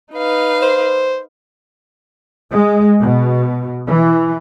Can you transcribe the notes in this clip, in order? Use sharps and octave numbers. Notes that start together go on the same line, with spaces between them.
D#4 B4 F5
C5
G#3
B2
E3